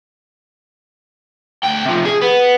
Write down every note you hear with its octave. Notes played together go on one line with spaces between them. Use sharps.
D2 G5
C3 F3
G#4
B3